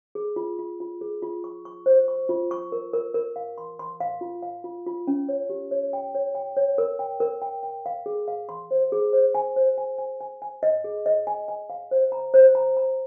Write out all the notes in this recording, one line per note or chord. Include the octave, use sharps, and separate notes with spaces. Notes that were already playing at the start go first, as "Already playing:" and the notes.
G#4
F4
F4
F4
G#4
F4
C#6
C#6
C5
C#6
F4
C#6
A#4
A#4
A#4
F5
C6
C6
F5
F4
F5
F4
F4
C#4
C#5
G4
C#5
G5
C#5
G5
C#5
A#4
G5
A#4
G5
G5
F5
G#4
F5
C6
C5
G#4
C5
G#5
C5
G#5
G#5
G#5
G#5
D#5
G#4
D#5
G#5
G#5
F5
C5
A#5
C5
A#5
A#5